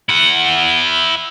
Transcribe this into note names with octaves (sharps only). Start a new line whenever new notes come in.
E4 F#5